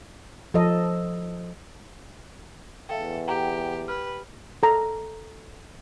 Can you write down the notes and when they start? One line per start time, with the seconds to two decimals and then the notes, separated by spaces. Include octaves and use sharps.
0.54 F3 A4 D#5
2.89 E2 A4 E5 F5 G5
3.28 G4 F#5 G5 A#5
3.88 B4 F6
4.63 A4 A#5